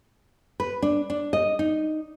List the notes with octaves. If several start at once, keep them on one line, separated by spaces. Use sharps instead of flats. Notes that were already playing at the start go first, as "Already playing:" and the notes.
B4
D4
D4
D#5
D#4